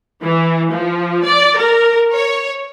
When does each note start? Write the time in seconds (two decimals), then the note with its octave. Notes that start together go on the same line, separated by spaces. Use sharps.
0.23 E3
0.71 F3
1.25 D5
1.57 A#4
2.14 C#5